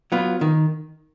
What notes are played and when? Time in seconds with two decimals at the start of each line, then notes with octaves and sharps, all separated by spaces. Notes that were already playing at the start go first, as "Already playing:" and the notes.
0.12 F#3 B3 F4
0.41 D#3